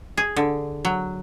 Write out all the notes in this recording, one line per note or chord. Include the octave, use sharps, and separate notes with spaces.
G#4
D3
F#3